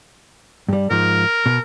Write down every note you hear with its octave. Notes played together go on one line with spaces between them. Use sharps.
G2 G3
G#2 F3 A#4
B2